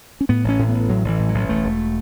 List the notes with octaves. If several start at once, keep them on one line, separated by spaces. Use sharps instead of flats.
C#4
A2 B3
A1 C#4
A2
A1 B3
A2 F#3
A1 E3
A2
F#3
A1
E1 A3
E1